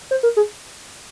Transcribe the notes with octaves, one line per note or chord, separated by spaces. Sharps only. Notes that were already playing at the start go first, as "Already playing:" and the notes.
C5
A#4
G#4